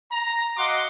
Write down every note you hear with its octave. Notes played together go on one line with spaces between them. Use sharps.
A#5
F#4 D#5 F5 F#5 C6 D6